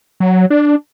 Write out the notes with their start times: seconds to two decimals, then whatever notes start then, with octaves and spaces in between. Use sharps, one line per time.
0.20 F#3
0.50 D4